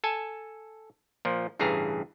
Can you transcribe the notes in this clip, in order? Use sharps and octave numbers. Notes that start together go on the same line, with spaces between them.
A4 G#5 A5
A#2 F3
A1 G2 C#3 E3 G#4 A#5